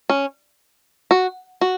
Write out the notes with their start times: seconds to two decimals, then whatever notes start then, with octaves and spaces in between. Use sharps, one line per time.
0.10 C#4
1.11 F#4
1.61 F#4